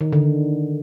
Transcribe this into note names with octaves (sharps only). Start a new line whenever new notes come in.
D#3
D3